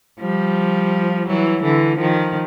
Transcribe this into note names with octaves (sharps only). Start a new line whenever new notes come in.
F3 G3
E3 F#3
D3 E3
D#3 F3